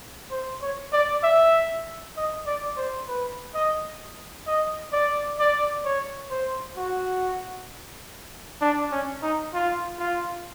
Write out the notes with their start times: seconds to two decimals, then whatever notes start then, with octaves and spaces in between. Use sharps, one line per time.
0.31 C5
0.62 C#5
0.93 D5
1.24 E5
2.17 D#5
2.47 D5
2.77 C5
3.08 B4
3.54 D#5
4.47 D#5
4.93 D5
5.39 D5
5.85 C#5
6.31 C5
6.77 F#4
8.62 D4
8.92 C#4
9.23 D#4
9.54 F4
9.99 F4